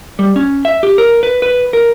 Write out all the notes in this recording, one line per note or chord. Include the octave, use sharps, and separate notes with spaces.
G3
C#4
E5
G4
A#4
B4
B4
A#4